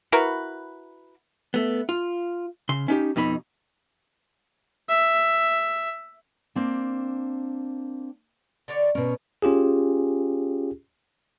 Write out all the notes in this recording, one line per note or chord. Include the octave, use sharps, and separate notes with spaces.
E4 F#4 A#4 B4
A3 B3
F4
C#3 C6
C#4 D#4 G4
F2 B2 D#4 B5
E5
A#3 C4 D4
D3 C#5 D5
B2 C#4 A#4
C#4 F4 G4 G#4